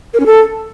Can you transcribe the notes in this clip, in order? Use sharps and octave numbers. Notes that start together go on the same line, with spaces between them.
A#4
C#4
A4